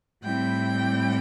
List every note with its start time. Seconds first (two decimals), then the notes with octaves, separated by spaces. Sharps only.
0.23 A2 G3 C4 E4 G5